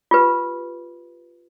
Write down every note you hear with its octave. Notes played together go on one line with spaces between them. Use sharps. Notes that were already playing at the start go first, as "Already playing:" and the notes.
F4 G4 B4